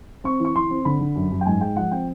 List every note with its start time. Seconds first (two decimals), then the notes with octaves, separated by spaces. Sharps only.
0.24 C4 C#6
0.40 E3
0.45 C#6
0.56 E3 C6
0.70 C4
0.85 D3 B5
1.01 D3
1.16 F#2
1.32 F#2
1.41 G5
1.46 G#2 G#5
1.61 G#3 G5
1.76 F3 F#5
1.91 C4 G5